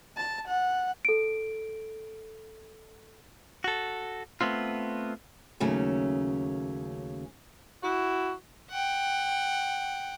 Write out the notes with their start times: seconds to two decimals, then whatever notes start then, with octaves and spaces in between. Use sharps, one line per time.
0.17 A5
0.48 F#5
1.05 A4 D7
3.64 F#4 A4
4.41 A3 B3 C4 F4
5.60 D#2 C#3 F#3 A3 C#4
7.83 E4 F#4
8.71 F#5 G5